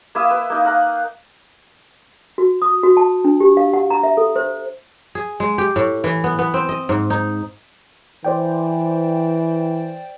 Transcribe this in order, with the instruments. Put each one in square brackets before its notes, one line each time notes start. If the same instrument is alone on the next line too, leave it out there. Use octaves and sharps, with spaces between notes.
[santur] A#3 E4 E5 D#6
B4
A#3 D#4
F5 F#5 A#5
[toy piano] F#4
D#6
F#4
A5
D4
G4
F5
F#5
A#5
E5
A4
C5
[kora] G#4
G#3
G4
A2
E3
B3
B3
C4
D#5
G#2
D#4
[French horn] E3 [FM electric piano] C5 D5 G5